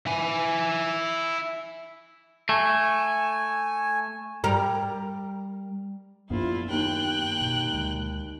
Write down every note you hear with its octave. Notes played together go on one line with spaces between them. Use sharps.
E4 G#5
A3 G#5
G3 A#4
A#1 F#2 B3 E4 F4
D#2 G5 F#6
B2
D2 G#3